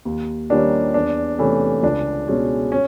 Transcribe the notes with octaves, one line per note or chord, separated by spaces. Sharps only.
D#2
D#3 G3 A#3 C#4 D4
E2 D4
C3 E3 A3 C#4
C#2 D4
B2 G#3 C#4
C#4